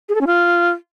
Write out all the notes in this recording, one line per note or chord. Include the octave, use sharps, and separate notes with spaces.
G#4
A4
C#4
F4